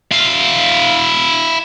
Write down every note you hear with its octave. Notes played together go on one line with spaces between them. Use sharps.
E4 F5